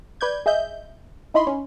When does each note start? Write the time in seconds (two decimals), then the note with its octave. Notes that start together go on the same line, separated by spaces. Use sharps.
0.21 B4 D5 G6 G#6
0.46 G#4 D#5 E5 G6
1.34 D#4 E4 D#5 B5 C6
1.47 C#4